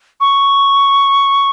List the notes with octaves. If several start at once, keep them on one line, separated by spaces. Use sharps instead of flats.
C#6